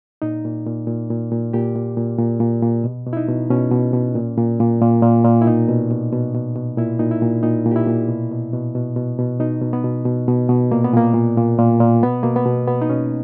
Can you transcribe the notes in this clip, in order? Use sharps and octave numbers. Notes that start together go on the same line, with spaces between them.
A#2 D#4
A#2
A#2
A#2
A#2
A#2
A#2 G4
A#2
A#2
A#2
A#2
A#2
B2
B2
E4
D#4
B2
B2 C#4
B2
B2
A#2
A#2
A#2
A#2
A#2
A#2
E4
B2 D#4
B2
B2
B2
B2
B2
A#2 E4
A#2 D#4
E4
A#2
A#2 D#4
A#2
G4
E4
A#2
B2
B2
B2
B2
B2
B2
B2 D#4
B2
B3
B2
B2
B2
B2
A#2 A#3
B3
A#2 A#3
A#2
A#2
A#2
A#2
B2 B3
B2 A#3
B3
B2
B2 B3
D#4
B2 C#4